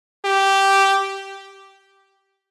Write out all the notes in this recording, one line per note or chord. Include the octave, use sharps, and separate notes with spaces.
G4